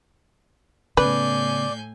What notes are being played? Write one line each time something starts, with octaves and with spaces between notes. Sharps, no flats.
A2 C#3 B3 B4 D5 G#5 G6